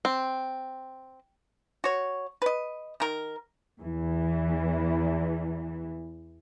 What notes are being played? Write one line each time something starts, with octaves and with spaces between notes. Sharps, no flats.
C4
F#4 C#5
B4 D#5
D#3 A#4
E2 E3